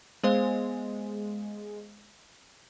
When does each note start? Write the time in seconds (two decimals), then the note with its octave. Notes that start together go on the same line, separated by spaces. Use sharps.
0.24 G#3 B3 C5 F5